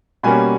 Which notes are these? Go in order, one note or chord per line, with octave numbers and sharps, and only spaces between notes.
B2 G3 A#3 C#4 G#5 B5